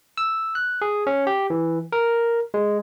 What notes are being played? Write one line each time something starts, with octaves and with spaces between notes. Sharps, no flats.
E6
F#6
G#4
C#4
G4
E3
A#4
G#3